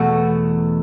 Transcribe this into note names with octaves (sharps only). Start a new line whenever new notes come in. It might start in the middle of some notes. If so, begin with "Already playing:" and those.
Already playing: E2 B2 A3 F#4